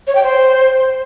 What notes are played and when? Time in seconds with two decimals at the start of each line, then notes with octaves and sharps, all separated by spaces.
0.07 C#5
0.15 G5
0.24 C5